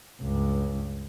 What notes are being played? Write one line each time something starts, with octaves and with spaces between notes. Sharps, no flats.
C#2 G2